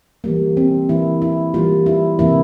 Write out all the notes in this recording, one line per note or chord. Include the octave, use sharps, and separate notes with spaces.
E3 G3 A#3
C4
E3 A#3 E4
E4
E3 G3 A#3 F4
E4
C3 E3 A#3 E4